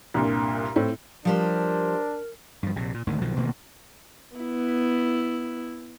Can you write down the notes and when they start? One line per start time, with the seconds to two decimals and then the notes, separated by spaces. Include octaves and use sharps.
0.14 C2 G2 A#2
0.76 A2 C4
1.25 F3 G3 D4 A#4 C5
2.63 G2 F3
2.76 A#1 C3
2.94 A#2
3.07 G#1 D2 G#2 D#3
3.21 B1 B2 D#3 F3
3.36 A1 B2 D#3 A#3
4.37 B3 E4